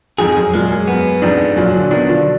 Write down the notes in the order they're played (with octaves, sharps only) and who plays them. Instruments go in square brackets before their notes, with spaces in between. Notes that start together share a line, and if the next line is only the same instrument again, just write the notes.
[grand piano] F2 G#2 [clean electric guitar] G#4
[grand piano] F#2
[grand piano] F#2 A#2 [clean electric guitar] G#3
[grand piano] F#2
[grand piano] F#2 [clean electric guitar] B3
[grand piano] F2 G#2 [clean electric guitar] D4
[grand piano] F#2 A#2 [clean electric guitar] F#3
[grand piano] A#2 D3
[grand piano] B2 D#3 [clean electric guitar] D4
[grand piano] D3 F3